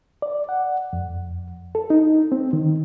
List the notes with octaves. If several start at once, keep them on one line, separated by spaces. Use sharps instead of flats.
D5
F#5
F2
A4
D#4
C4
D#3